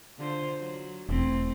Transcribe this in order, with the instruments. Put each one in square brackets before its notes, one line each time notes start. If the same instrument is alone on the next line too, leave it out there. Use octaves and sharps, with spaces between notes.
[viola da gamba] D3 F4 C5
F#3
[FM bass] E1 [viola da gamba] A3 C4 E4